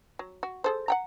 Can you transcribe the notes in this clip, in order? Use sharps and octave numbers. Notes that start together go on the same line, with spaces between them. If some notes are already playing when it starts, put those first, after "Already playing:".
F#3
F#4
G#4 A4 C5
F#5 G5 A#5